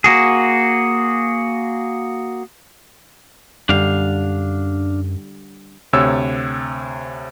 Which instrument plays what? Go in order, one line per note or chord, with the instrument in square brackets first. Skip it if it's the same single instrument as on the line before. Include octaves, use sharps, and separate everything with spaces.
[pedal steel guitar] A#3 F#4 G#4
[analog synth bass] F#2 [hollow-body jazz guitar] D3 G3 [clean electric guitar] D4 F5
[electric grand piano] D2 C3 C#5 E6